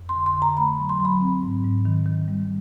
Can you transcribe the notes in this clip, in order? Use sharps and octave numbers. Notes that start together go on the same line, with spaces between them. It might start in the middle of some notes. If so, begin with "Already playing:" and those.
Already playing: F2
C6
D3
C6
D3
A#5
A3 B5
F#3
C6
F#3 B5
C4
G#2
G#2
D#3
D#3
G3